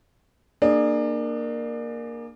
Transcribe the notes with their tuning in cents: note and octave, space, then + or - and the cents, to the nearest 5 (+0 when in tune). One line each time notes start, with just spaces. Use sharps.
A#3 +0 D4 +30 G#4 +0